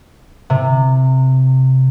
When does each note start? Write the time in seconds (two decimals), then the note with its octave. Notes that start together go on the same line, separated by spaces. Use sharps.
0.50 C3